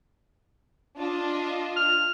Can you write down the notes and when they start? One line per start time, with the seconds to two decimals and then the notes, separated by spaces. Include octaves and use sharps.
0.97 D4 F4 D#5
1.77 F6